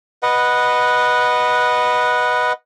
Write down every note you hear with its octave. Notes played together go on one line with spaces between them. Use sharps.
B4 D#5 F#5